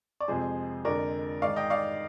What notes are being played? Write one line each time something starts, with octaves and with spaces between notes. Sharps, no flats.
D5
F2 C3 F3 G#3 G#4 C5
F2 D3 G#3 A#4 D5
G#2 D#3 G#3 D5 F5
D#5 G5
D5 F5